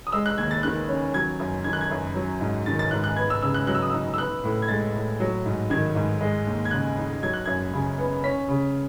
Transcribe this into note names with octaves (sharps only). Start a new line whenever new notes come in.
D#6
G#3 E6
F#6
D#2 G#6
A6
D#3 F#6
C#4
F#3 G#6
F#2
D#3 G#6
F#6
G#6
F#2
F#3
G#2
D#3 A6
A6
G#2 F#6
F#6
B3 G#6
E6
C#3 E6
F#6
F#3 F#6
E6
D#6
D#4 E6
E6
B3 F#6
A2
G#6
G#3 A6
A2
F#3
G#2
D#3 G#6
G#2
G#3
D#2
G#6
C#3 F#6
D#4
F#3 G#6
F#6
F#2 G#6
C#3
B3
C#4 B6
C#3